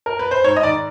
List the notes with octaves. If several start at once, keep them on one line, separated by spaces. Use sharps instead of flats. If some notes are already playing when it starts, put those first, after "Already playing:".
A#4
B4
C5
G#2 C#5
D#5
D#3 D5